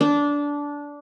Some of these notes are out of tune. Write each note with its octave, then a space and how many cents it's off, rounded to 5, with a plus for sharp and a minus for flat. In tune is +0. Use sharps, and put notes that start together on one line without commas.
D4 -15